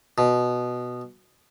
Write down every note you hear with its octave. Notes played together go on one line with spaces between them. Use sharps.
B2